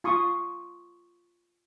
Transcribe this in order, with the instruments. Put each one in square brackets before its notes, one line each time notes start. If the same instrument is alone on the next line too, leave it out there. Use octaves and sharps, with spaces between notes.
[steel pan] F4 C6 C#6 D#6